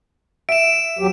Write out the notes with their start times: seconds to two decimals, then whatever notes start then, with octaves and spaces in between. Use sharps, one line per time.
0.49 E5 D7 E7
0.99 E2 F#3 G4